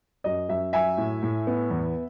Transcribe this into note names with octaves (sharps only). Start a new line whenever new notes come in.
F#2 D#5
F#2 E5
F#3 E5 G#5
A2
A2
B3
E2